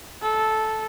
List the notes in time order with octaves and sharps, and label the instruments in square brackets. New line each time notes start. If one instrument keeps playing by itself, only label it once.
[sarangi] A4